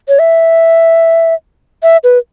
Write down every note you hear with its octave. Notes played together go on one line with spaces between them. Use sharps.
C#5
E5
E5
B4